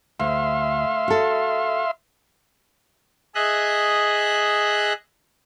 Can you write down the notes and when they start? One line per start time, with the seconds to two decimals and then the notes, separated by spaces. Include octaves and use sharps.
0.20 D2 E5 F5 C6
1.08 F#4 A4
3.35 G#4 D#5 E5 F#6